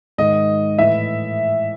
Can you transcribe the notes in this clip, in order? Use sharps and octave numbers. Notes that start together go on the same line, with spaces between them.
G#2 D#3 D#5
A2 E3 E5